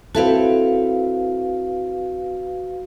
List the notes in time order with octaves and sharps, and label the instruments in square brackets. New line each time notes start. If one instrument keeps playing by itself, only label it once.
[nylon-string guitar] C4 E4 A4 [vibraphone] F#4 B4 F5